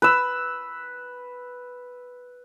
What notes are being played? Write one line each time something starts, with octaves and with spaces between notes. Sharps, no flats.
B4 E6